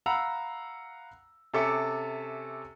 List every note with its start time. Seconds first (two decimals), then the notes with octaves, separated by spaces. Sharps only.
0.06 F5 F#5 A#5 B5 E6
1.54 C3 C#4 A4 E5 D6 C#7